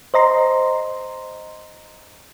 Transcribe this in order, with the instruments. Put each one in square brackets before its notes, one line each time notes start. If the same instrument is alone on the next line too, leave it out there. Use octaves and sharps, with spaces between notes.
[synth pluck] C5 D#5 A#5 C6